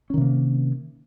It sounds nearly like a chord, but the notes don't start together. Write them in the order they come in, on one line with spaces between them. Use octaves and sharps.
C#4 D#3 C3 A#3